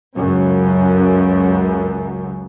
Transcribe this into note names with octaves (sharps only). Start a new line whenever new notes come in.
C#2 F#2 C#3